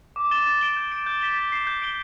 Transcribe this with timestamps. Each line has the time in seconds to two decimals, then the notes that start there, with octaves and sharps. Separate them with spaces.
0.16 D6
0.31 A6 E7 G7
0.46 A6
0.61 D7 G7
0.77 G6
0.92 D7 G7
1.06 G6
1.21 B6 E7 G7
1.37 A6
1.52 C7 E7
1.67 G6
1.82 D7 G7